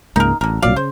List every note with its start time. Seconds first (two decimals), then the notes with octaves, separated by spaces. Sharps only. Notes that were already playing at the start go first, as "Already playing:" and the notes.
0.16 C#2 G#2 A#3 D#4 A#4
0.41 A1 D3 A#4
0.62 C2 A#2 F#3 D5 F5
0.76 C#3 C5